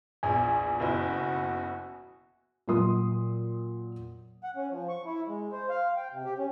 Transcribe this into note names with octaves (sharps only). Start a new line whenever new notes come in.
A#1 E2 G#5
F#1 B2 E4 F#4
A#2 F#3 C6 D#6
F#5
C#4
F3
C#6
E4
G#3
C5
F5
G5
C3
G4
C#4